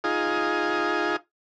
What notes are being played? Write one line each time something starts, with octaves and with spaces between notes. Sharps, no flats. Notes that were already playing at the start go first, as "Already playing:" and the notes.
D#4 F4 G#4